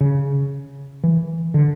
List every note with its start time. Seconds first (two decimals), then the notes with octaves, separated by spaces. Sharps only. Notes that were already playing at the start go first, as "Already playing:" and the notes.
0.01 C#3
1.04 E3
1.54 D3